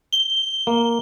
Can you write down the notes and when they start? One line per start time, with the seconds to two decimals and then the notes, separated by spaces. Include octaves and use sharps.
0.13 G7
0.67 A#3